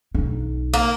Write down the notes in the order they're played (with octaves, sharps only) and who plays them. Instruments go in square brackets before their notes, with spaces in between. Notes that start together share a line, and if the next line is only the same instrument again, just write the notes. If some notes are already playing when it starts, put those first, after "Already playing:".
[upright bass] B1 D#4
[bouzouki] A#3